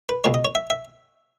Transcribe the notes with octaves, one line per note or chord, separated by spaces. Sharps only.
B4
C#2 B2 G#3 C#5
D#5
C#5
E5
E5